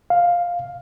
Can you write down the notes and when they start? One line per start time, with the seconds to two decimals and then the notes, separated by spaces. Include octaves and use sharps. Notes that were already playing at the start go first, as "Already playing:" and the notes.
0.10 F5